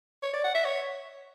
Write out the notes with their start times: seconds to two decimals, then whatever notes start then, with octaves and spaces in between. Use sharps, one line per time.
0.23 C#5
0.33 D5
0.44 F#5
0.55 E5
0.65 C#5